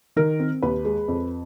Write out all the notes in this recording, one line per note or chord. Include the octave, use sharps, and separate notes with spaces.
D#3 A#4
C4
D#2 B4
G#3
F2